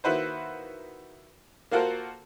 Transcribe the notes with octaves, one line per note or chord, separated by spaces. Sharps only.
D#3 A#3 E4 F#4 B4 C5
A#3 F4 F#4 A4 A#4 C5